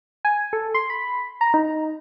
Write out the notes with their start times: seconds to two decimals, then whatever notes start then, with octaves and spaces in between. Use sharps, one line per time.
0.25 G#5
0.53 A4
0.74 C6
0.90 B5
1.41 A#5
1.54 D#4